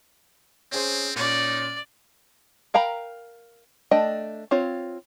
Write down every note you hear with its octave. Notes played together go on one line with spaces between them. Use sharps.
C4 C#4 G#4 C5
A#2 C#4 D#4 D5
A#4 F5 G5 A#5 B5
A3 D4 D#5 G5
C4 F4 C#5